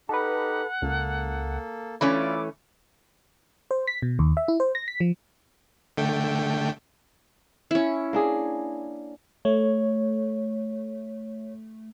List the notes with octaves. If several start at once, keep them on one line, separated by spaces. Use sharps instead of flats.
D#4 G4 A4 B4 F#5
C#2 A#3 A4
E3 A3 C#4 F4 D5 B5 D6
C5
B6
B2
D#2
E5
E4
C5
A#6
B6
F3
D3 A3 G5
C#4 E4
A#3 D4 G#4
A3 C#5